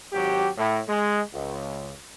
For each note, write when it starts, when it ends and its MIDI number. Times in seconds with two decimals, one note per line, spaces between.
0.13 0.48 32
0.13 0.48 54
0.13 0.48 67
0.57 0.80 45
0.88 1.20 56
1.34 1.91 37